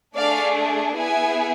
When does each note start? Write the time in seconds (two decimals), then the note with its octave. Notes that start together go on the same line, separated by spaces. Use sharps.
0.15 A3 D4 G#4 D5 F5
0.96 B3 E4 G#4 E5 G#5